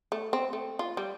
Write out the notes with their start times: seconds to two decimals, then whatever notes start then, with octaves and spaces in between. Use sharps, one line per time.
0.12 A3
0.33 C4
0.53 A3
0.79 F4
0.97 G3